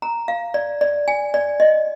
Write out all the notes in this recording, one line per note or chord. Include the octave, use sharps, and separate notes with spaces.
A#5
F5
D5
D5
G#5
D5
D#5